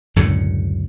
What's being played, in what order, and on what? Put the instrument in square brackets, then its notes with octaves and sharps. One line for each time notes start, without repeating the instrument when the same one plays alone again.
[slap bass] C#2 F#2 A2 D3